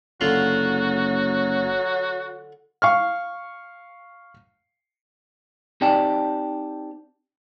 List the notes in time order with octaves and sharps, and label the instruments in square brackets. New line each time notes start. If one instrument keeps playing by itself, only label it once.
[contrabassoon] F#1 [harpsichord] D3 F4 C6 [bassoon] F#3 [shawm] F#4
[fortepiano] F5 C#6 F6
[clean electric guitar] C4 D#4 G4 D5 G5 A5